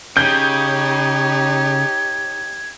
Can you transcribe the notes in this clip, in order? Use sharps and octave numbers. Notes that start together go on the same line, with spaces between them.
C#3 D#4 G4 C#5 G6 G#6